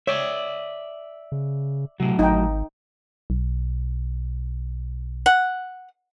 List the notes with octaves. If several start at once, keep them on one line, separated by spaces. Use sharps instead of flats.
C#5 D5 E5
C#3
A2 C3 F#3
G#1 D#4 G5
B1
F#5